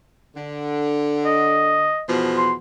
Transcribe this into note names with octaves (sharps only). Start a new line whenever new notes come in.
D3
D#5
E2 B2 F3
C6